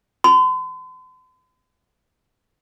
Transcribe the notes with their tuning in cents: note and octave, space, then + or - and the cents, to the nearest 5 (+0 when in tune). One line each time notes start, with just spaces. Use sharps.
C6 -45